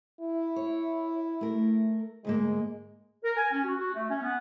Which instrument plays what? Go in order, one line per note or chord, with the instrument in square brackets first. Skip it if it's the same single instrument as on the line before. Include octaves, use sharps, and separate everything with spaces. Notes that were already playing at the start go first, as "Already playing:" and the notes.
[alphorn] E4
[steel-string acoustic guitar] C#5
A3 A#4
[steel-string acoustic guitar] D2 G#2 A#3 [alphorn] G#3
[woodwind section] A#4
G#5
C#4
F#4
F#4
A3
C#4
B3